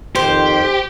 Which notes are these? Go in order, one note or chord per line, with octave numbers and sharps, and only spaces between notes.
F2 D#3 G4 C5